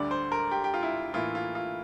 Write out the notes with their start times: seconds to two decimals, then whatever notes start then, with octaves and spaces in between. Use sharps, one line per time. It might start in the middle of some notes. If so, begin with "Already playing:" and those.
Already playing: D2 D3 G3 D5
0.11 C5
0.32 A#4
0.51 G4
0.64 G4
0.74 F4
0.83 E4
1.14 A2 E3 A#3 E4 F4
1.35 F4
1.55 F4